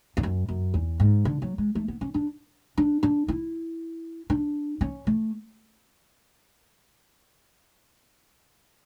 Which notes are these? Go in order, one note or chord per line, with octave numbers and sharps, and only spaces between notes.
E2
F#2
F#2
E2
G#2
D3
F#3
G#3
A3
B3
C#4
D4
D4
D4
E4
D4
C#4
A3